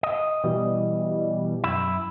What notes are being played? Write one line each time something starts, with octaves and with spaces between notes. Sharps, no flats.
D#5
B2 E3 G3
F#2 E4 E5